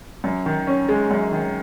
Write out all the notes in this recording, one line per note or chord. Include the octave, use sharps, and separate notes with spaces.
F#2
D#3
C#4
G#3
F#2
D#3